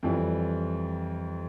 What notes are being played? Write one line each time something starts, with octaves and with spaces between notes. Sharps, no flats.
F2 E3 G3